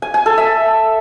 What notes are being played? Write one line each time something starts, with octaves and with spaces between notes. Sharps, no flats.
G#5
G#5
A4
E5